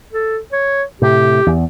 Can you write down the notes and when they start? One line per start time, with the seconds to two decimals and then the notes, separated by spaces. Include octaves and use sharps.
0.13 A4
0.52 C#5
1.02 A2 C3 G4
1.46 E2